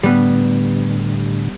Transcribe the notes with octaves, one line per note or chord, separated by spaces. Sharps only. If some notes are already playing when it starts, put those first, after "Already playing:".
A2 D3 G3 B3